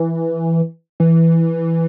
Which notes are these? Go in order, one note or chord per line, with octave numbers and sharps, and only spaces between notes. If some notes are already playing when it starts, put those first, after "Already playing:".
Already playing: E3
E3